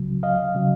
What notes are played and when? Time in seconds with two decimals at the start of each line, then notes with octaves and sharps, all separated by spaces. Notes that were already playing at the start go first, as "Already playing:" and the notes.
Already playing: C#2 C#3 F#3
0.23 D#5 F5
0.55 C#3 F#3